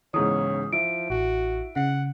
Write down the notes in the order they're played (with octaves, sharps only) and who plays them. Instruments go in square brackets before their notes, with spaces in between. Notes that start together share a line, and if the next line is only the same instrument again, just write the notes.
[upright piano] B1 G#2 C#3 [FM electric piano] E3 [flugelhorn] C#5 [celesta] D#6
[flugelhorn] F3 [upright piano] E4 [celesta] D7
[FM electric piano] A1 [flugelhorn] F#4
[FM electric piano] C#3 [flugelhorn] F#5